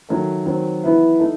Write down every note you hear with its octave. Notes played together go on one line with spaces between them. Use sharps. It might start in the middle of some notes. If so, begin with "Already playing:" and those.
D#3 F#3 A3
D#3 F#3 C4
E3 B3 E4 B4
A3 D#4